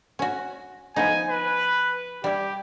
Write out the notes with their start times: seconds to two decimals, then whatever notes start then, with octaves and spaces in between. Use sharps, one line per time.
0.19 C#4 F#4
0.96 F3 B3 D#4 G#5
1.29 B4
2.24 G3 E4 G4